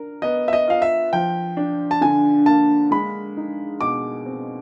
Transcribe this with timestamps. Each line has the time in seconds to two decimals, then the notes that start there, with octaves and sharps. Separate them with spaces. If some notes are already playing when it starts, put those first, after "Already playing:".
Already playing: D4 A#4
0.22 B3 D#5
0.48 E5
0.53 D#5
0.67 F4 F5
0.82 E5
1.13 F3 G5
1.57 D4
1.91 A5
2.01 D3 G#5
2.46 A#3 A5
2.91 G#3 B5
3.37 D#4
3.81 B2 D6
4.26 C4